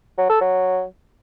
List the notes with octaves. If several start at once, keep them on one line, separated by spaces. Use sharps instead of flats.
F#3
A4
F#3